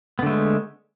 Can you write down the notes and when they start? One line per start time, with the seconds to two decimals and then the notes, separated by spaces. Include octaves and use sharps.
0.19 B3
0.23 D3
0.26 A3
0.30 G#3